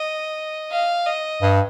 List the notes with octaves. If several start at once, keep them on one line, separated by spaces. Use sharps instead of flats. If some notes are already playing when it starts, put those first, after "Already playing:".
Already playing: D#5
F5
D#5
G2